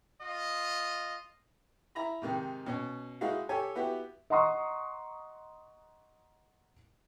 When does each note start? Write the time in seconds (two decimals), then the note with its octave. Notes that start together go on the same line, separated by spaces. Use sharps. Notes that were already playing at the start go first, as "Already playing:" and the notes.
0.20 F4 D#5
1.95 E4 A#5 B5
2.22 G#2 C3 D#3
2.66 B2 C#4
3.21 G#3 D#4 E4 F#4 F5
3.49 G4 A4 C#5 G#5
3.75 B3 E4 F#4 G4
4.30 D#5 F#5 A#5 C6 C#6 D#6